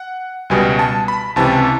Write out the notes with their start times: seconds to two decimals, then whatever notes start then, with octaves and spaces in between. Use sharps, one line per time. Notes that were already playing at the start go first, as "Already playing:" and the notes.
Already playing: F#5
0.50 C#2 B2 G3 B3 G#5
0.79 A5
1.08 B5
1.36 C#2 C3 E3 A5